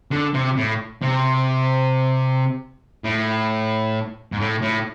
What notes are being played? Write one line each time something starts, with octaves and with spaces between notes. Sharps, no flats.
D3
C3
A2
C3
A2
G#2
A2
A2